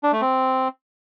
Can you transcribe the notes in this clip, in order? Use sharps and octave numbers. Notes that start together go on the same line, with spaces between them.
D4
A3
C4